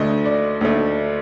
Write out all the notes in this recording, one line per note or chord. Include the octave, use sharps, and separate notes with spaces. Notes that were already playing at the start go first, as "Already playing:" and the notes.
Already playing: D2 D3 A3 D#5
D5
D2 D3 A3